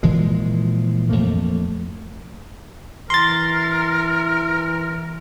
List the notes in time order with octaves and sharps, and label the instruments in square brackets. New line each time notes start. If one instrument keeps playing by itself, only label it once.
[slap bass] A#2 E3 F3 G#3
F2 A3 A#3
[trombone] E3 [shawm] A#4 [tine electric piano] C6 A6